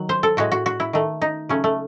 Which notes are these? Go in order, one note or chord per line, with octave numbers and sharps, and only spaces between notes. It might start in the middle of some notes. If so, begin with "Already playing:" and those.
Already playing: D#3 F#3
C5
A4
A2 G#3 F#4
F#4
F#4
E4
D#3 A3
D#4
C#3 F#3 A3 C#4
A3